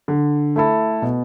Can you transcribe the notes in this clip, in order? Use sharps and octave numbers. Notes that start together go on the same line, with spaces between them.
D3
A3 E4 A4
B2